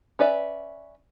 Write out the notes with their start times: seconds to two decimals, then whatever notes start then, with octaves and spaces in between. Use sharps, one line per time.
0.19 C#4 B4 D5 E5